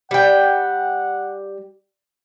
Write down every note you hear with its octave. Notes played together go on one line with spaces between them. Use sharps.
G3 F#5 G5